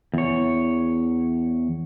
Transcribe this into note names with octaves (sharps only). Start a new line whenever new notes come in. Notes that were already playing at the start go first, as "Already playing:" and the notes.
E2 C#5